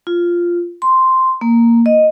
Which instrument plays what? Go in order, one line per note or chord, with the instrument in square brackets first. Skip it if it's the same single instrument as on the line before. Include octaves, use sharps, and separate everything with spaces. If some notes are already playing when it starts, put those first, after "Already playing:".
[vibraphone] F4
C6
A#3
D#5